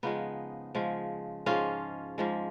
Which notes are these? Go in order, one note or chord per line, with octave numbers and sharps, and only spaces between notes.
C#3 F3 G#3 B3 D#4
C#3 F3 G#3
G#2 F3 G#3 C#4 F4
G#2 F3 G#3